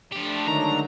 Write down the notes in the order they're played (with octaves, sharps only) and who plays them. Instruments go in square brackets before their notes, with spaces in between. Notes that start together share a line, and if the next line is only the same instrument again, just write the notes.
[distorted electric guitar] F3 G4 [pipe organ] A3 D4
[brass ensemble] D3 F#3 G#3 [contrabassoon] D#3 [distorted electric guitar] A#5